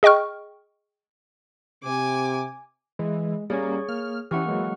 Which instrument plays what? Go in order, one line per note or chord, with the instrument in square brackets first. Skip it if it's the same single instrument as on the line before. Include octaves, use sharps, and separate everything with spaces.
[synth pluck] G#4 D#5 G5 C#6 F6
[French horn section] C3 [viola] G#5 D6
[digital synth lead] E3 [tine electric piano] G#3
[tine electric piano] G3 C#4 [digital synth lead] A#3 [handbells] G#4 C#5 C#6
[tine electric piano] A#3 [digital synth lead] F6
[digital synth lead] E3 [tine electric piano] C#4 E4 G4 [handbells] F#5 C#6 F6
[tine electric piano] F#3 G#3 A#3